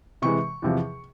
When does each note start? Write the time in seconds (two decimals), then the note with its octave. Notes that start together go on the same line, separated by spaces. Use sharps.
0.22 C3 E3 G#3 C#6
0.62 E2 C3 F3